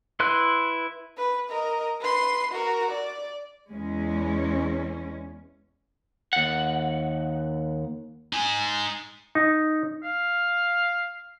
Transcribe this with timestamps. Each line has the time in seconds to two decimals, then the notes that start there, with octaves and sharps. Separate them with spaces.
0.20 E4 B4 C6 F#6
1.17 B4
1.50 A#4 D#5
2.00 B4 C6
2.52 F#4 A#4
2.91 D5
3.71 E2 G#3 C#4
6.33 D#2 F#5
8.33 D#4 G#5
9.35 D#4
10.03 F5